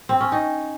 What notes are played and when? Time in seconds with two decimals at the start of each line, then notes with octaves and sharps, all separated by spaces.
0.09 C4
0.20 C#4
0.32 D#4